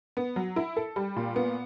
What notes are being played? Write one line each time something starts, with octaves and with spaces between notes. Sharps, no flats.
B3
F#3
E4
A4
G3
A#2
B3